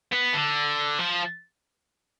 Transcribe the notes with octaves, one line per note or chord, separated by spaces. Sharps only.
B3
D3
F3